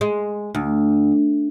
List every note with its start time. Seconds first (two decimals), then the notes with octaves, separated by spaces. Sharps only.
0.01 G#3
0.55 D2